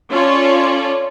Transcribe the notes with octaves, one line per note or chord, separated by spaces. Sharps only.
C#4 F4 A4 C#5 D5